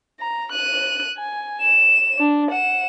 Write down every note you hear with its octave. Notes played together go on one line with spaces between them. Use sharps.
A#5
F#6 D#7
G#5
E7
D4
F#5 E7